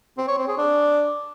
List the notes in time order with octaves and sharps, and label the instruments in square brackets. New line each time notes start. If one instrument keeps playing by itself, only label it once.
[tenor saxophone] C4
C#5
C4
G#4
D4